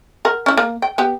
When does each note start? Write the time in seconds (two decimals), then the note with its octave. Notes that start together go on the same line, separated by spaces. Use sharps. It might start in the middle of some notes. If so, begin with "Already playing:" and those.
0.25 A#4 F#5
0.46 C#4 E4
0.57 A#3
0.82 G5
0.98 B3 G4